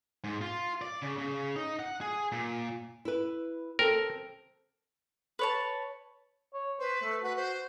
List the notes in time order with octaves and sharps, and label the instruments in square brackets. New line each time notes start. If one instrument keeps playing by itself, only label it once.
[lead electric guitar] G#2
F4
D5
C#3
C#3
D#4
F#5
G#4
A#2
[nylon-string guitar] E4 B4
[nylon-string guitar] C4 A4 [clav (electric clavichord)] A#4
[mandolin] B4 C#5 A5
[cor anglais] C#5
[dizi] B4 [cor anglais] C5
[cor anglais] A3
[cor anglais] F#4 [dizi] B4
[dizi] C5